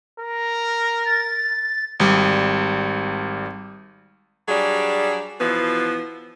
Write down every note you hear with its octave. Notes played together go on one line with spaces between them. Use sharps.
A#4
A6
G#1 G3
F#3 G3 D4 G#4
B2 E3 F3 B3